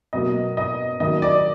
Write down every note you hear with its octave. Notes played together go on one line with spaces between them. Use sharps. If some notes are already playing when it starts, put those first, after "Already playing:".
B2 F#3 A#3 D#5
D#5
D#3 F#3 A#3 D#5
D5